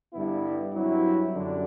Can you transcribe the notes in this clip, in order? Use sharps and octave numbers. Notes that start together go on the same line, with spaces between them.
G2 D3 G3 B3 E4
G2 F#3 C4 E4
F#2 D3 G3 D4